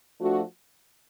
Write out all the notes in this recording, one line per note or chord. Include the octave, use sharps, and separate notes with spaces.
F3 A3 D4 F#4